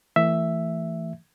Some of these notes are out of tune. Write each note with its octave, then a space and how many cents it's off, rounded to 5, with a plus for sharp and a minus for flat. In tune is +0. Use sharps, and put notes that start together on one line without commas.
E3 +10 A3 +30 E5 +0